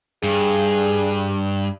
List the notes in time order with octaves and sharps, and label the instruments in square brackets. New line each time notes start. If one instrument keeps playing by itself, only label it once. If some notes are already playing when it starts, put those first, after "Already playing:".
[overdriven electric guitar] G2 [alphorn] G#4